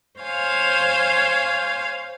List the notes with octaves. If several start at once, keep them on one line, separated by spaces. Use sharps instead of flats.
C5 C#5 F5 G#5